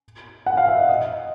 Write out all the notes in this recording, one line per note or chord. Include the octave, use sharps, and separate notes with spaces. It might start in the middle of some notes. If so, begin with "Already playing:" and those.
F#5
F5
E5
D#5
D#5